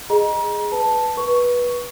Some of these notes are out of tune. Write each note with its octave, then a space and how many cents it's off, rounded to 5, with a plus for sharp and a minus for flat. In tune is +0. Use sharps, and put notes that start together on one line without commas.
G#4 +0 D#5 -10 A#5 +35
B4 +0 A5 +0
B4 -20 C#6 +5